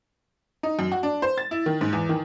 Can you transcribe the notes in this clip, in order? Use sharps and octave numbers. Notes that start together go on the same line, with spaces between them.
D#4
F#2
F#4
D4
C5
A6
E4
D#3
G#2
E2
D#3